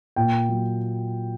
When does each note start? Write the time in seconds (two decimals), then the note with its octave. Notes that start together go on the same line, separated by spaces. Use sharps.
0.16 A#2 G5
0.49 F#3